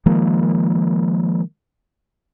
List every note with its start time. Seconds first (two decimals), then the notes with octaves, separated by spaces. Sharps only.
0.06 D#3 F3 G#3 A#3